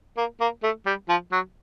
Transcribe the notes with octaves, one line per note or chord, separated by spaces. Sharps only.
A#3
A#3
A3
G3
F3
F#3